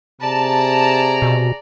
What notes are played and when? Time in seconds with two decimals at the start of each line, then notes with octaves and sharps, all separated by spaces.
0.21 C3 G#4 D5 A5 A#5
1.22 B2